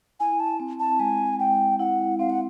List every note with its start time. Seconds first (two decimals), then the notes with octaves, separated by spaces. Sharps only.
0.20 E4 G#5
0.40 A5
0.60 C4
0.80 A5
0.99 G#3 G#5
1.39 G#3 G5
1.79 E4 F#5
2.19 C4 F5
2.30 F#5